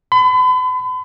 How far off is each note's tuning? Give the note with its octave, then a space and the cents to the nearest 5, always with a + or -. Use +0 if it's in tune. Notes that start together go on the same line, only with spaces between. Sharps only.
B5 +40